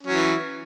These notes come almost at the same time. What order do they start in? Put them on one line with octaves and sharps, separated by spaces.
C#4 F#3 E3